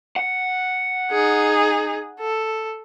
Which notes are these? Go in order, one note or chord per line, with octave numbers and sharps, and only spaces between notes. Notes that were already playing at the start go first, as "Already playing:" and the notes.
F#5
D#4 G#4
A4